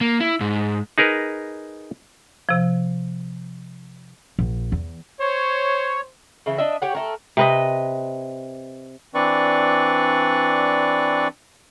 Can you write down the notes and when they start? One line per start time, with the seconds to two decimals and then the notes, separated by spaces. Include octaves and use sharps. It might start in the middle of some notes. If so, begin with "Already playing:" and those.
0.01 A#3
0.20 E4
0.41 G#2
0.98 D#4 G#4 A#4 B4
2.49 C3 F3
4.39 A#1
4.72 E2
5.20 C5 C#5
6.46 C#3 E3
6.58 D4 D#5 E5
6.82 G4 C#5 F#5
6.95 A3 A#4
7.37 C3 B4 D#5
9.14 E3 C4 D4 B4 D5 C#6